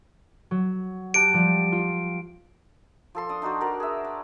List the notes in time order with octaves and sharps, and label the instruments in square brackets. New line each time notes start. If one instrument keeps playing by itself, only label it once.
[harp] F#3
[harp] G4 F#5 A5 [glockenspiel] D7
[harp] F3 G3
F4
[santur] F3 A4 C6
D4 D5 D#6
D4 D#4 F#4 C5
F#4 A#4 D5
G#4 E5
D5